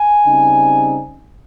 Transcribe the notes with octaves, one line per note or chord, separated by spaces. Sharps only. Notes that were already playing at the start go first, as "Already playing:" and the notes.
Already playing: G#5
C#3 G3 C4 D#4